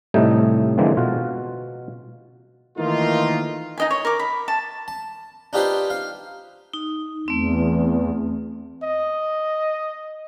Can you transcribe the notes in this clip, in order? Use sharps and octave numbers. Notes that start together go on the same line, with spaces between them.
A2 C3 G3 A3 D#4 G5
D3 E3 F3 G#3 A#3 C4
B2 F4 F#4
D#3 E3 A3 A#3 D#4 F4
D#4 D#5 G#5
C#5
A#4 D6
B5
A5
A5
D4 D#4 F4 G4 B4 C5
F5
D#4
E2 A3 C4
D#5